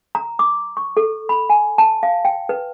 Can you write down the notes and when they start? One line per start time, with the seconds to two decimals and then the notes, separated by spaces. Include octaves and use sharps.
0.15 A#5
0.39 D6
0.77 C#6
0.97 A4
1.29 B5
1.50 G#5
1.78 A5
2.03 F5
2.25 G5
2.49 B4